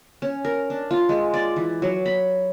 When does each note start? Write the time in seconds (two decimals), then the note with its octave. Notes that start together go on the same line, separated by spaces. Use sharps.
0.22 C#4
0.45 A#4
0.70 D4
0.91 F4
1.09 G#3
1.34 D5
1.56 E3
1.82 F#3
2.06 B5